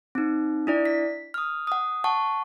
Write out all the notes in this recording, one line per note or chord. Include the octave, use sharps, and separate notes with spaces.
C4 D#4
D4 E4 D5
B6
D#6 F6
F#5 D#6
F#5 A5 C#6